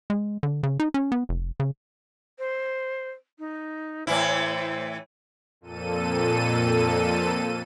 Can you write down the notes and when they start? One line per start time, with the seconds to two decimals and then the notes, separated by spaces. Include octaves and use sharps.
0.10 G#3
0.43 D3
0.63 C#3
0.80 D#4
0.94 C#4
1.12 B3
1.29 F1
1.60 C#3
2.39 C5
3.39 D#4
4.07 A2 E3 E4 C5
5.61 F2 A#2 A4 D#7